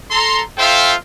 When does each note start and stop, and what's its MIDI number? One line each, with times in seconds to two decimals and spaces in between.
0.11 0.41 69
0.11 0.41 82
0.11 0.41 84
0.58 0.94 65
0.58 0.94 69
0.58 0.94 72
0.58 0.94 76
0.58 0.94 77
0.58 0.94 79